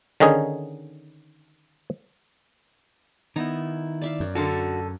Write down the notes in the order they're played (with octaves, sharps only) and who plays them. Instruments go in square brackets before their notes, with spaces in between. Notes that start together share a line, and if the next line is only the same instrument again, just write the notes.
[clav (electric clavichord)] D3 D#3 C#4 D#4 G#4
[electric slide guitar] D#3 E4 [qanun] B3 D#4 A#5
[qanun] D5 E5 F5
[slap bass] F#2
[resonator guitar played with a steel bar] D3 A4 [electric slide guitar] F#4 [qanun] A#4 F5 A5